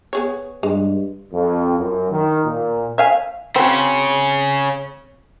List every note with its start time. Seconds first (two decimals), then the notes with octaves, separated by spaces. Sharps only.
0.13 B3 G#4 C#5
0.63 G2 G#3
1.33 F2
1.79 F#2
2.11 D#3
2.46 A#2
2.98 E5 F5 G#5
3.56 C#3 C4 C#4 F#4